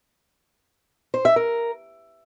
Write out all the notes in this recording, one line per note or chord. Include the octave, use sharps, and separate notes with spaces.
C5
E5
A#4